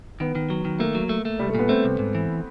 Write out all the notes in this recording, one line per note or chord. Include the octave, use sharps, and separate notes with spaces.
D#3 B3
D#3
F#3
D#3
A3 A#3
F#3
A3
A3
C2 G3
A3
A#2 B3
A3 C4
C2
G#2
E3